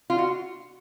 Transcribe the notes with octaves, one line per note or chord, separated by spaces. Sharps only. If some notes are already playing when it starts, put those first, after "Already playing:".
F4
F#4